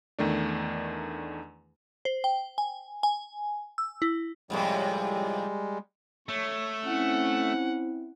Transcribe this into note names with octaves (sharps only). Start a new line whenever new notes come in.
E2 D#3 A3 D4
C5
G5
G#5
G#5
E6
E4
F2 A2 C3 G3 G#3
A3 C#5
C4 C#4 E4 F#5